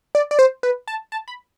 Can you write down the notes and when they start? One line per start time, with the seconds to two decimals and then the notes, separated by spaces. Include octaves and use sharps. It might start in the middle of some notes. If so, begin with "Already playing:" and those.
0.15 D5
0.31 D5
0.39 C5
0.63 B4
0.88 A5
1.12 A5
1.28 B5